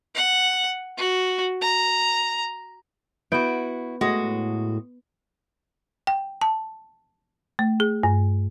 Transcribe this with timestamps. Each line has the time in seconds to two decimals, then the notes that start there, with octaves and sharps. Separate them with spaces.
0.15 F#5
0.97 F#4
1.61 A#5
3.32 B3 E4 F#4 G6 D7
4.01 A2 G#3 F#4
6.07 G5
6.42 A5
7.59 A3
7.80 G#4
8.03 G2